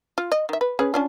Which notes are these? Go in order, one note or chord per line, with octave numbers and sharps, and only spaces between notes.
F4
D#5
D#3 E5
B4
C#4 G#4 B4
C#4 D4 F4